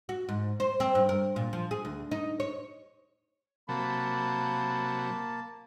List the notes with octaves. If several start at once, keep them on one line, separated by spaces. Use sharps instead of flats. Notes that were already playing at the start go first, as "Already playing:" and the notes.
F#4
G#2
C5
C4
G2
A#4
A#2
F3
G#4
D2
D#4
C#5
C3 F#3 A#3 A5 B5